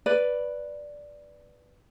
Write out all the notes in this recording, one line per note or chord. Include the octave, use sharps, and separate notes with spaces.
B4 D5